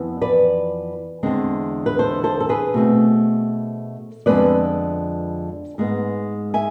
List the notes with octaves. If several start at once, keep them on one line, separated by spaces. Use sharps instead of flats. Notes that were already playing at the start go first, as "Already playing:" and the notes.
Already playing: F2 E3 B3
B4 D5
E2 D3 G#3 C4
B4
A4 C5
A4 C5
A4
G#4 B4
B2 A3 C4
F2 D3 G#3 B3 B4 D5
G#2 G#3 B3
E5 G#5